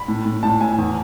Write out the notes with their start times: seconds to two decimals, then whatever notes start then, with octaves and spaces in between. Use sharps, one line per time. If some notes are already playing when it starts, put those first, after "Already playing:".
Already playing: B5
0.08 A2
0.26 A2
0.43 A2 A5
0.61 A2 G#5
0.78 E2